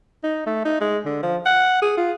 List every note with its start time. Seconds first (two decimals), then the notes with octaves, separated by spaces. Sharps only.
0.23 D#4
0.46 A3
0.65 D#4
0.81 G#3
1.05 D3
1.23 F3
1.46 F#5
1.82 G#4
1.97 F4